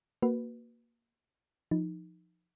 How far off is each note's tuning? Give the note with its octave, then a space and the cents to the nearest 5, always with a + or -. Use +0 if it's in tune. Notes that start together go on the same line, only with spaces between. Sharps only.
A#3 +0 F#4 +0 B4 +0
F3 +0 D#4 +0